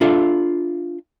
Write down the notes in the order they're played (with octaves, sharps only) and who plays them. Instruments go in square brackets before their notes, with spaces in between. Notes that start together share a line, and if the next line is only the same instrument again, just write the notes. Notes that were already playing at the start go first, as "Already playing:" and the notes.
[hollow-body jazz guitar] D4 F4 A4 E5